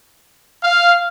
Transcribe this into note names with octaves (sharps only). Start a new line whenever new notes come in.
F5